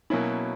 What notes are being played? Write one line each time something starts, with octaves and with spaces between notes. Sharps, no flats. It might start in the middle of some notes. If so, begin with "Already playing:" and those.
B2 F#3 A#3 C#4 E4